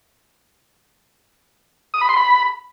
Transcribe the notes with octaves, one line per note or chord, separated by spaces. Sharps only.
D#6
B5
C6
B5